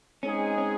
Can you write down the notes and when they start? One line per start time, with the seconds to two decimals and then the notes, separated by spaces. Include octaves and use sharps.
0.23 G#3 C4 C#4 D#4 G#4
0.58 C#4